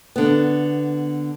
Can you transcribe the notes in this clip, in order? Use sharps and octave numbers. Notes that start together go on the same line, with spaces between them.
D3 B3